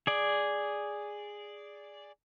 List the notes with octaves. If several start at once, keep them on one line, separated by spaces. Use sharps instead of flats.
G#4 D5